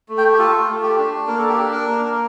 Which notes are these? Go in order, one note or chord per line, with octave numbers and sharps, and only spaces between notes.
A3
G5
G4
F4 A4
A3
G4
D4
A#3 A#4
A4
G4
D4 A4
A#4
A#3